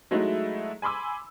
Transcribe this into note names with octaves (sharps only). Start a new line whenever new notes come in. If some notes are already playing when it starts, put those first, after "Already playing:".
F#3 G#3 A3 D#4 E4 F#4
G#5 B5 C6 D6 E6